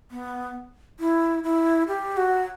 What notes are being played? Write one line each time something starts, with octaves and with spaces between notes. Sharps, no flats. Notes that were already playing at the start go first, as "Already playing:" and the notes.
B3
E4
E4
G4
F#4